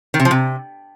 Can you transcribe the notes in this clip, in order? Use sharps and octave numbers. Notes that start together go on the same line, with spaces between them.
D#3
C3
F3
C3